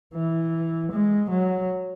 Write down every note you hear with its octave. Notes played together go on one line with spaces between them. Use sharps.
E3
G#3
F#3